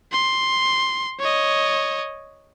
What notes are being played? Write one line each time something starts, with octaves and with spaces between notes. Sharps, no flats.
C6
C#5 D#5